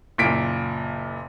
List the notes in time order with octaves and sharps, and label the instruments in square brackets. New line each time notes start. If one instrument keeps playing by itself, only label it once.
[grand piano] F#1 A#2 B6 D7